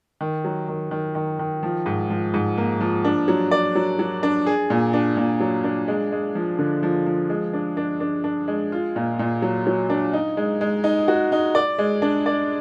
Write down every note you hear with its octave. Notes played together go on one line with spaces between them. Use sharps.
D#3
F#3
D#3
D#3
D#3
D#3
F3
G#2
F3
G#2
A#3
F3
D4
F#3
D5
F#3
F#3
D4
G#4
A#2
D4
A#2
F#3
D4
G#3
G#3
F3
D3
F3
F3
G#3
D4
D4
D4
D4
G#3
F4
A#2
A#2
F#3
F#3
D4
D#4
G#3
G#3
D#4
F#4
D#4
D5
G#3
D4
D5